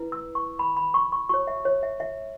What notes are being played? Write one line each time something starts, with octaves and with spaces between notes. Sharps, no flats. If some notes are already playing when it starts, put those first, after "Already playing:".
Already playing: E4 B4
E6
C#6
B5
B5
C#6
C#6
F#4 C#5 C#6
E5
C#5
E5
E5